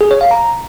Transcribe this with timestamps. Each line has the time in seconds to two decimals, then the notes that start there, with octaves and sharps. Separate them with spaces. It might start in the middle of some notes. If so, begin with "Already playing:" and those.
0.01 G#4
0.11 C#5
0.21 F5
0.31 A#5